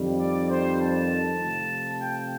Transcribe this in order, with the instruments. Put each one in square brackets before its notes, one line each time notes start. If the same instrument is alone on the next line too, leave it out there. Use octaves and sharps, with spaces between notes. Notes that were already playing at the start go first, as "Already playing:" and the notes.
Already playing: [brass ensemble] F2 D#3 G3
D5
C5
A5
C3 F3 A3
G5